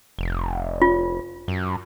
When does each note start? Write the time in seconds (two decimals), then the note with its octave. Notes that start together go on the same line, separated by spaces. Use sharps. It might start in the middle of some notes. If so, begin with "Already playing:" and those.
0.19 F1
0.82 F4
1.48 F#2